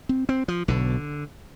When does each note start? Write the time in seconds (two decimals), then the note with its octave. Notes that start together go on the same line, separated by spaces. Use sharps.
0.09 C4
0.29 C4
0.48 F3
0.68 B1 B2 D3